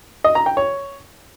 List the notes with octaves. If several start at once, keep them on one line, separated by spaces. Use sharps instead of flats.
D#5
A#5
G5
C#5